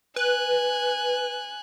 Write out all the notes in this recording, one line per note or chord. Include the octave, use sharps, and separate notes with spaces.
B4 G#5 F#6